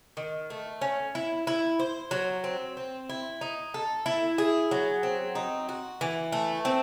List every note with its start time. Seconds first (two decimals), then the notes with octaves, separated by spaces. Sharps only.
0.17 D#3
0.50 A3
0.81 C#4
1.15 E4
1.47 E4
1.79 C5
2.11 F#3
2.44 C4
2.77 C4
3.09 E4
3.41 D#4
3.74 A4
4.06 E4
4.38 G#4
4.71 F#3
5.03 C4
5.35 D#4
5.69 F#4
6.01 E3
6.32 A3
6.65 C4